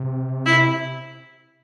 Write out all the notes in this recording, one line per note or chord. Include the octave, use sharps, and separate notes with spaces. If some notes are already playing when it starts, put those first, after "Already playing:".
Already playing: C3
E4